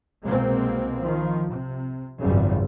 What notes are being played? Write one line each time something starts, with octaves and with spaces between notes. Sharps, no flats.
C2 B2 G#3 A#3 C4
D#3 F3
C3
G#1 C#2 F#2 C#3 G3